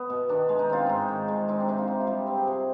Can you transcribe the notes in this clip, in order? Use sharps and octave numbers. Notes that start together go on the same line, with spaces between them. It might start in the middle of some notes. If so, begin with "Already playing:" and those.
Already playing: B3
B2
D#3 D4
G#3
D#4
C4 F4
G#2 D#4
D#3
G#3
C4 D#4
D4
C3 D#4
F4
C3
F4
G3 G4
C4
G#4
C3